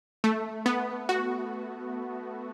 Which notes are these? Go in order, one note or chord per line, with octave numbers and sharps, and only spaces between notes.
A3
B3
F#4